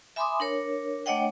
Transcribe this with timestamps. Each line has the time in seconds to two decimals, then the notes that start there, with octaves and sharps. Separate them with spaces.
0.16 E5 G#5 B5 C6 D6 D#6
0.40 D4 A#4 C#5
1.06 A3 D4 C#5 D#5 F#5 G5